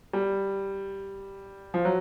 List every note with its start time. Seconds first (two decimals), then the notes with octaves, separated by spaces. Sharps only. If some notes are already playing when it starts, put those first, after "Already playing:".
0.13 G3
1.74 F3
1.85 F#3